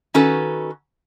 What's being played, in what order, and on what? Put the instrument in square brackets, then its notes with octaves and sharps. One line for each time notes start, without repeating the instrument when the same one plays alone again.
[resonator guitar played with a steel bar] D#3 C#4 F#4 A4 B4